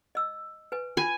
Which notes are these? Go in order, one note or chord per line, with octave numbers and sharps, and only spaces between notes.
D#5 E6
B4 G#5
F4 G#5 B5